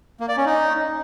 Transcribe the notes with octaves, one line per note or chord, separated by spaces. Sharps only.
A#3
D5
C#4
D#4